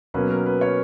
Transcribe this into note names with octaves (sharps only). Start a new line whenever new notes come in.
B2 F#3 A#3 C#4 B4
A#4
B4
C#5